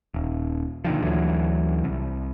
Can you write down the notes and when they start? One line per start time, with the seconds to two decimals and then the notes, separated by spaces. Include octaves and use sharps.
0.14 D#1
0.85 A#2 D3 D#3 F3
1.02 D2 D3 E3 F#3
1.84 C2